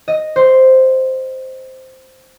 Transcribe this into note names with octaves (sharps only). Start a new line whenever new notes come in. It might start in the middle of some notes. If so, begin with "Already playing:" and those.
D#5
C5